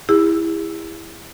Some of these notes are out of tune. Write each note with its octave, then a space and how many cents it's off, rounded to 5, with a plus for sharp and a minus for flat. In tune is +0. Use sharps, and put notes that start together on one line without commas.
E4 +0 G#4 -45